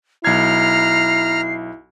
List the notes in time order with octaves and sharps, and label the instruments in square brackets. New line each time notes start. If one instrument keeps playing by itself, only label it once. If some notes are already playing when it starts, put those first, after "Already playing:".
[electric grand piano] B1 G#6 [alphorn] E4 [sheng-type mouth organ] A#5 F6 [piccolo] C7